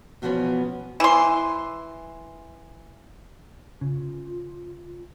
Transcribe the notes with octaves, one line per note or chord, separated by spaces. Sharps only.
E2 B2 E3 F3 B3 C#4
E3 C6
C#3 F4